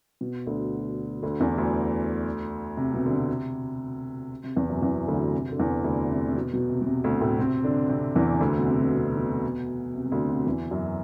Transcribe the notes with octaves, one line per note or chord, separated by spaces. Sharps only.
B2
D2 D3
D2 D3
E2 E3
D2 D3
C3
B2
D3
C3
C3
E2 E3
F#2 F#3
E2 E3
D2 D3
C3
D3
E2 E3
D2 D3
C3
C3
B2
B2
C3
B2
C3
D2 D3
A2 A3
C3 C4
D3 D4
C3 C4
E2 E3
C3
D2 D3
B2
C3
B2
C3
B2
C3
C3
D2 D3
C3
E2 E3
F#2 F#3